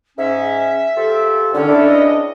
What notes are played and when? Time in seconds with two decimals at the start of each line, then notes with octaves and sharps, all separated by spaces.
0.18 G#2 C#4 E5
0.97 F3 G4 A4
1.54 C2 D3 D#3 C#4
1.68 D4 E4 A4
1.86 C#2 E4 D#5